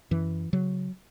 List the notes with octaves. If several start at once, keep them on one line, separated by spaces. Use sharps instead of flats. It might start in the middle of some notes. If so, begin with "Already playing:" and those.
F#2 E3
C#3 F#3